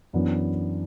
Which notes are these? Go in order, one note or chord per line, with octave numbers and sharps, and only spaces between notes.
F#2 E3 B3 D4